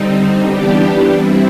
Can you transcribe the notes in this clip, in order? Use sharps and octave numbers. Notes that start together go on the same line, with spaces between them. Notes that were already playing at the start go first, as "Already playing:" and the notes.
Already playing: D3 G3 C4 D#4
E3 G3 B3 D4 G4
G3 C4 E4